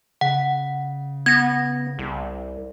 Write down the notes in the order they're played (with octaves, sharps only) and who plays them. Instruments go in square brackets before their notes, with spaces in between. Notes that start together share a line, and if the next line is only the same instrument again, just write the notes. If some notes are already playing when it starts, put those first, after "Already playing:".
[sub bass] C#3 [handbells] F#5
[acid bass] B3 [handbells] G#6 A#6
[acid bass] C2